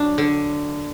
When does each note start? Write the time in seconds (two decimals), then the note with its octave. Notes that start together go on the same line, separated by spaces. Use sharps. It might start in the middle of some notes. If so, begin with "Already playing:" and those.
Already playing: F#3 D4
0.18 D3